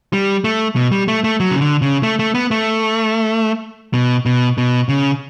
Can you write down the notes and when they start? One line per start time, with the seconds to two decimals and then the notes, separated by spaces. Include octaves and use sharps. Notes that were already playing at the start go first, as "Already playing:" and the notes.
0.13 G3
0.44 A3
0.76 B2
0.92 G3
1.08 A3
1.24 A3
1.40 F#3
1.51 C#3
1.61 D3
1.82 C#3
2.03 A3
2.19 A3
2.35 B3
2.51 A3
3.94 B2
4.26 B2
4.58 B2
4.89 C#3